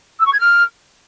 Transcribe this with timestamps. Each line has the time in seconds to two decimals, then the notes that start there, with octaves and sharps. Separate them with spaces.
0.19 E6
0.26 C#6
0.32 G#6
0.39 F6